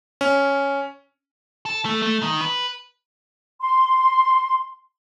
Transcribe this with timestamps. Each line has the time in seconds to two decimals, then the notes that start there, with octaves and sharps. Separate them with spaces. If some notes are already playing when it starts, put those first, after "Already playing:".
0.21 C#4
1.66 A4
1.85 A3
2.02 A3
2.23 D#3
2.41 B4
3.60 C6